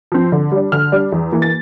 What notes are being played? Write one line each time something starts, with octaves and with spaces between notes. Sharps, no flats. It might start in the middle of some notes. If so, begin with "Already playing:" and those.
F3 C4
D3
G3 D4
D3 F6
G3 D4
E2
E3 A#3
A6